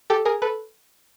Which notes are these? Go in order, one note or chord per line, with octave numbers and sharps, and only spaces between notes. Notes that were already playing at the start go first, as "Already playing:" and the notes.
G4 A4
G#4 A#4
A4 B4